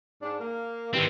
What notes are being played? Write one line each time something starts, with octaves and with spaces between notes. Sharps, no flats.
G#2 D4
A#3
G2 D#3 C4 E4 G4